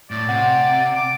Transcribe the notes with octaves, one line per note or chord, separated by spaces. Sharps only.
A2 D5
C3 F#5
D6